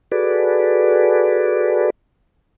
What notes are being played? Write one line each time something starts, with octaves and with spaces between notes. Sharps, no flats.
F#4 G#4 A4 B4 D5